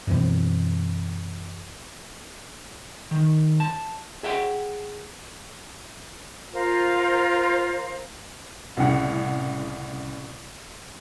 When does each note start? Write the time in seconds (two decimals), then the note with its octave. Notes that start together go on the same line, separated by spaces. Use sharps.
0.07 F#2 B2 E3 C4
3.11 D#3
3.60 A5
4.23 G#4 E5 F#5 G5
6.54 F4 A#4 C5 F5
8.77 C2 A2 C#3 F#5